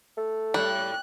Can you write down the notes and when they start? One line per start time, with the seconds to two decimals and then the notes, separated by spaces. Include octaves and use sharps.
0.17 A3
0.54 F2 A2 G3 F#6